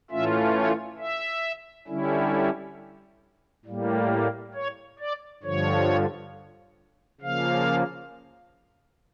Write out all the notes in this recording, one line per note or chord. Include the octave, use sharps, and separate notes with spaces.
A2 E3 A3 C#4 F4 E5
C#5
E5
D3 G3 C#4 E4
A2 G3 A#3
C#5
D5
G2 D3 F3 C#5
C#3 F3 A#3 F5